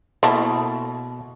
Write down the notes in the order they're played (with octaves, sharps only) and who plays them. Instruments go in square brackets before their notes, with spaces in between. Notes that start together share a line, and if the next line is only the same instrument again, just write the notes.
[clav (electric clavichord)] B2 [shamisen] A#3 E4 A4